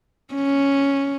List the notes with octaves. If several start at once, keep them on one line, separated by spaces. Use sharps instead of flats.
C#4